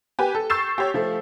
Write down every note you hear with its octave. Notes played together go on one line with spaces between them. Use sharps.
G4 B4 G#5
A4
C#6 E6 G6 A6 C7 E7
G4 C#5
F3 A3